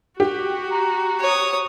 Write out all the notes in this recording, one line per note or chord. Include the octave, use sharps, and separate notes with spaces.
F#4 G4
A#5
C#5 D#6